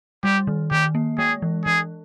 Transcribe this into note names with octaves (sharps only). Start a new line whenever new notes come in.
G3 G4
D#3
D#3 G4
A#3
G#3 G#4
E3
E3 G#4